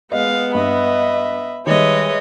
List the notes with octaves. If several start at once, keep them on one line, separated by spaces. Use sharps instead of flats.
G#3 B3 D#5 F5
G2 D#5 E5 B5
D#3 G3 G#3 B4 C#5 D#5 E5